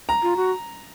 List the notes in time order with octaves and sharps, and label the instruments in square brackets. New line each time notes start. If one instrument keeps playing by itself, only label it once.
[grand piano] A#5
[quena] F4
F#4